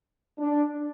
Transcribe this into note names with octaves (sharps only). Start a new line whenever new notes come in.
D4